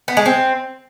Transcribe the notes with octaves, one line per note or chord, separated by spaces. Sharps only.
B3
G#3
C4